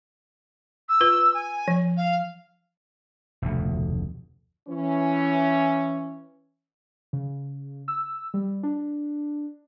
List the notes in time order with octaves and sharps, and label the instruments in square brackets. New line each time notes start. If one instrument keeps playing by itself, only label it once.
[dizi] E6
[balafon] F4 B4
[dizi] G#5
[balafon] F3
[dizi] F5
[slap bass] F1 D2 B2
[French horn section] E3 C#4
[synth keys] C#3
E6
G3
D4